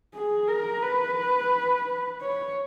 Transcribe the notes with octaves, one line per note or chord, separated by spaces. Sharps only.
G#4
A#4
B4
C#5